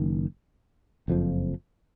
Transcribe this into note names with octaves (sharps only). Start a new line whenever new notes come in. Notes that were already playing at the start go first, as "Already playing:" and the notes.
Already playing: F#1 D#3
F#1 F2 F3